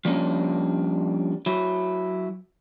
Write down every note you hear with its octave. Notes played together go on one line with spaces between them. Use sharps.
F3 G3 A#3 C#4 D4
F#3 E4